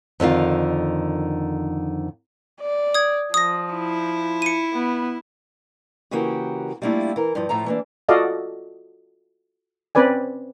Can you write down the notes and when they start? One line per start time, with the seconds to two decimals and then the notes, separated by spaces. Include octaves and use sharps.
0.20 F2 D3 D#3 F4
2.61 D5
2.94 D#6 G#6
3.34 F3 D#6 A#6
3.74 E4
4.42 C#7 D#7
4.73 B3
6.11 C#3 E3 A#3 F#4 G4 A#4
6.82 G3 A3 A#3 D4 E4 F4
7.16 E3 A#4
7.35 G2 F3
7.49 A2 F3 A3 A#5
7.66 E3 A#3 D4
8.09 F4 F#4 A4 D5 D#5 F5
9.95 C4 C#4 B4 D5 G#5